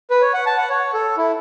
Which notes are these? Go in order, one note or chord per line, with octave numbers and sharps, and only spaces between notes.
B4
C#5
F#5
A5
F#5
C#5
A4
E4